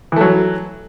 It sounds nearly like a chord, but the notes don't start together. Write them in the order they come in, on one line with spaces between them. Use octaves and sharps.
E3 A3 F#3